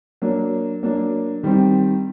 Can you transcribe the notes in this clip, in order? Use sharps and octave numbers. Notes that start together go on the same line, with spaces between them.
F#3 A#3 D4
F#3 A#3 D4
D#3 G3 C4